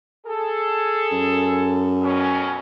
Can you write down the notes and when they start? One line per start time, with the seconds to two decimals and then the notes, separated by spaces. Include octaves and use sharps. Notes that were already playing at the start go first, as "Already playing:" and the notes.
0.24 G#4 A4
1.12 F#2
2.01 F2 B2 C#4